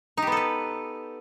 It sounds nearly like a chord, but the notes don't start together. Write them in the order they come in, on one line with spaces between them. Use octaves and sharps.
D#4 G4 B3 A4 B4